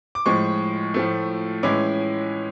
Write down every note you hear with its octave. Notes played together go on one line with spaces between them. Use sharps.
D6
A2 F3 G#3 C#6
A2 F3 A3
A2 E3 G#3 C#4 E4 D6